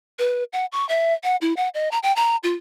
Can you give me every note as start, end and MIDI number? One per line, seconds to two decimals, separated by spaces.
0.19 0.44 71
0.53 0.66 78
0.72 0.87 85
0.89 1.14 76
1.23 1.36 78
1.41 1.54 64
1.57 1.69 78
1.74 1.91 75
1.91 1.99 82
2.03 2.14 79
2.16 2.36 82
2.43 2.54 65